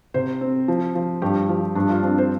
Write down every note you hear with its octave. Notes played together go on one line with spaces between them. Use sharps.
C3 C5
C4
F3
F3
G2 G4
F3
G2 D4
F4
C4 D4
C5